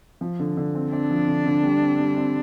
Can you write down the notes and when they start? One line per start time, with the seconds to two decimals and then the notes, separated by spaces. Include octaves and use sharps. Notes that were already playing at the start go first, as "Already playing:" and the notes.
0.21 F3
0.39 D3
0.57 D3
0.75 C4
0.92 C4 D4
1.11 F3
1.27 D3
1.46 D3
1.63 G3
1.81 C4
1.99 G3
2.17 C4